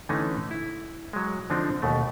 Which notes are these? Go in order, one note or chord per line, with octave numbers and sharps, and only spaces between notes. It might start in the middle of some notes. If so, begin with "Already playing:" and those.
D3 E3 A3 C#4 D#4
E4
F#3 G#3
D3 F3 C4 D4 D#4
D#2 B2 A3